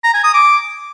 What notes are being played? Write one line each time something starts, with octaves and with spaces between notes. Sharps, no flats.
A#5
G#5
D#6
D6